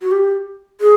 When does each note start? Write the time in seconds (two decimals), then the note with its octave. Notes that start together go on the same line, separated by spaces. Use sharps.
0.02 F#4
0.11 G4
0.81 G#4